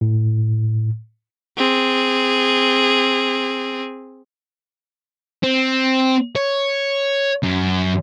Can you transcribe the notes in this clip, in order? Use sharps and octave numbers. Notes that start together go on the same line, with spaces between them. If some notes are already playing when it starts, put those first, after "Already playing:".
A2
C4 G#4
C4
C#5
F#2